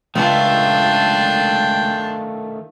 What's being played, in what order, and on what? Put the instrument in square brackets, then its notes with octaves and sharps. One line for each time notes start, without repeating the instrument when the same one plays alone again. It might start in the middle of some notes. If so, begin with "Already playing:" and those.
[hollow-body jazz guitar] C#2 [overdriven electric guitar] D#3 A3 [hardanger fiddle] D4 F4 [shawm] G5